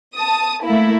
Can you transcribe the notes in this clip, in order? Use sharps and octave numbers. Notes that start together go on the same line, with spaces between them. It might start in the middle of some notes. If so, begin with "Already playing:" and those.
A5 D#6
A3 A#3 E4